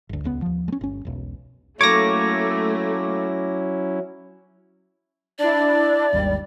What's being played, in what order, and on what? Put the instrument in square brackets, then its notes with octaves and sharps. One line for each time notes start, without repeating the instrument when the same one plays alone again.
[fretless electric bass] G1 D2
D#1 C#2 B3
D#2 F3
G#3 C#4
G1 C#4
E1 B1
[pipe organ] F#3 C#4 E4 [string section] A3 [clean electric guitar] A#3 C#5 [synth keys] D6 A#6
[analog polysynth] D4 E4 [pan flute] D5
[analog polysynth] G#1 D#2 G3